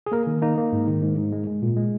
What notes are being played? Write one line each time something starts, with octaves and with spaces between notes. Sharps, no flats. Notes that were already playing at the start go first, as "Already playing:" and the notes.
G#4
A#3 A#4
D#3
A#3 D#4
A#3
G#2
D#3
G#2
G#2
G#3
G#3
A#2
G#3